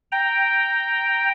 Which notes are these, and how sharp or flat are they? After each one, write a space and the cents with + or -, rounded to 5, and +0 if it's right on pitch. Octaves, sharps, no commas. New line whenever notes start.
G5 +0 A#5 +0